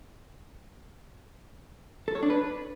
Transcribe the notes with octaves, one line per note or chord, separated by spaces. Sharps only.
A4
C#5
D4
B4